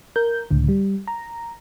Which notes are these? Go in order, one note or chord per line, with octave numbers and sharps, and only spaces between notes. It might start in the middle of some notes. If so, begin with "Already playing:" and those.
A#4 G6
C#2 A2 D3
G3
A#5